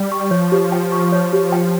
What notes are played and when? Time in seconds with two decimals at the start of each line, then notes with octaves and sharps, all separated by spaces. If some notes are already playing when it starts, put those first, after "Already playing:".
Already playing: G3
0.12 C#6
0.31 F3 C#5
0.52 G4
0.72 G5
0.92 C#6
1.12 C#5
1.33 G4
1.52 G5